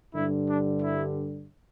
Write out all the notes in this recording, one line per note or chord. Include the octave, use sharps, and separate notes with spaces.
G2 D3 G3 E4
D4
E4